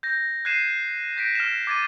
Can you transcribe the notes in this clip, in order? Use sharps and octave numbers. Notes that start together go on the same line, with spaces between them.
G6 A#6
F#6 G#6 C7 D#7 E7
G6 A#6 B6 D7
F6 E7
D6 G#6 A6 D#7